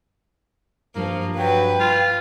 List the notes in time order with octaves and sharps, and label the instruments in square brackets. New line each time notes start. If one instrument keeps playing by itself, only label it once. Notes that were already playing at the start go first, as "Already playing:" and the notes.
[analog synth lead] G2 [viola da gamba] F3 [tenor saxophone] A#3
[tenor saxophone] F#3 [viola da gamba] B4 [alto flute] G5
[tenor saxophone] F4